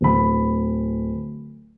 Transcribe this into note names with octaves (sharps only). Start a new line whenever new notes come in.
D1 B5